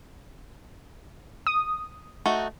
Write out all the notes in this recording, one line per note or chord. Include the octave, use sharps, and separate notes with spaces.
D#6
A3 D#4 F#4